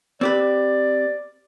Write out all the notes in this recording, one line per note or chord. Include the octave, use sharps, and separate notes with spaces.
C4 G4 B4 D5